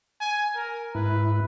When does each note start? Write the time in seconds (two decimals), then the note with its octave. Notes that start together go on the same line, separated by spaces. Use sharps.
0.21 G#5
0.56 A#4
0.95 G#2 E4 B4